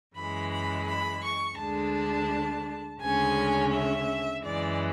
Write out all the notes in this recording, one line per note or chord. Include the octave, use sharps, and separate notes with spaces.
F#2 E3 G#3 B5
B5
B5
C#6
D2 D3 G#3 D4 A5
D2 C#3 G#3 C#4 G#5
E5
F#2 E3 G#3 D5